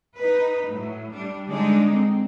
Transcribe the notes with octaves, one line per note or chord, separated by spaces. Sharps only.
D#4 B4
A2 F#3
G3 D4
D3 G#3 D4 D#4
C4